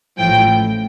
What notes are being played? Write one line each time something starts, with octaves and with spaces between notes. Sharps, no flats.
A1 A2 F3 G5